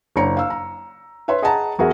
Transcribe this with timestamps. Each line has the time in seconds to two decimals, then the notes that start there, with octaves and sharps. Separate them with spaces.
0.16 F#1 D4 C#5 A#5 C#7
0.37 F5 E6
0.50 A#5
1.28 B4 C#5 E5 C6
1.42 G#4 D#5 F#5 A5 A#5
1.79 E2 F#4 G#4 A#4 E5